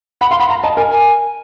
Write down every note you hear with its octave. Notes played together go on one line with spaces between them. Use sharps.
F#5 B5
F5 C6
F#5 B5
F5 A#5
D#5 A5
A#4 G#5
G#5